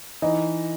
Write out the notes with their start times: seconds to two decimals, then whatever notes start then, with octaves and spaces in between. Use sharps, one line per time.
0.22 E3 D#4 D#5